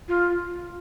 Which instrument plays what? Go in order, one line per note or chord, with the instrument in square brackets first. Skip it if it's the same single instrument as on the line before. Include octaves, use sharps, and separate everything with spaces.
[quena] F4